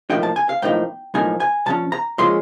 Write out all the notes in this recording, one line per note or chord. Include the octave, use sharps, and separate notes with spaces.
B1 A2 F3 A#3 D#4 G5
A5
G#5
F5
B1 A2 F3 A#3 D#4 G5
B1 A2 F3 A#3 D#4 G#5
G#5
A#2 F3 C#4 A5
A#5
A#2 F3 G#3 C#4 C6